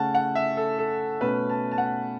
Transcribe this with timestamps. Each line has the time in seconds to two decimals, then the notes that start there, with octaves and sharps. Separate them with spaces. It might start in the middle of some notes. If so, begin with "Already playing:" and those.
Already playing: C#3 A3 C#4 F#5 A5
0.15 F#5
0.35 E5
0.57 A4
0.78 A4
1.21 B2 A3 C#4 B4
1.50 A5
1.71 A5
1.78 F#5